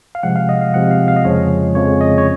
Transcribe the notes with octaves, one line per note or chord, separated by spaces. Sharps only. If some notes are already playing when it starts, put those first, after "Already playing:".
F5
C3 F3 G#3 F#5
F5
D#5
F5
C3 F3 G#3 F#5
F5
F5
D#5
F2 C#3 F3 G#3 C#5
F2 C#3 F3 G#3 C#5
D#5
C#5